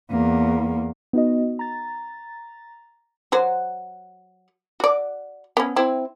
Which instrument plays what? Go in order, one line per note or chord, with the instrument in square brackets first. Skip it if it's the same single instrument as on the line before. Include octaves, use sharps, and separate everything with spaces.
[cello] E2 A#3
[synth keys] B3 D#4 F#4 D#5
A#5 A6
[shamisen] F#3 F#4 C5
F#4 D5
B3 C#4
C4 E4